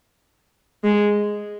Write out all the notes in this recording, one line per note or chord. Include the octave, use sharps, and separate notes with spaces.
G#3